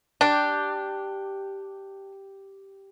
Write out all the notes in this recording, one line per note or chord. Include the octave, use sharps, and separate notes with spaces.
D4 G4